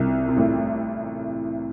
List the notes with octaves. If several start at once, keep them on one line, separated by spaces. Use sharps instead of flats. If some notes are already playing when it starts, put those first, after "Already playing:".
Already playing: C2 C3
C3
A1 A2